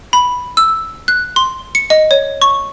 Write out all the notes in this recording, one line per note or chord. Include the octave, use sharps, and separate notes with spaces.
B5
E6
F#6
C6
C#7
D#5
C#5
C#6